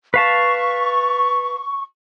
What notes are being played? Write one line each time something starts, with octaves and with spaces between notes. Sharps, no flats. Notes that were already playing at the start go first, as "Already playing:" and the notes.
B4 F5 A5 C#6